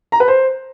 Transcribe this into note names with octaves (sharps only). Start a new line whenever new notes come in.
A#5
B4
C5